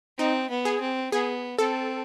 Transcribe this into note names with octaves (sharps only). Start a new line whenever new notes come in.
C4 D#4
B3
G#4
C4
B3 G#4
C4 A4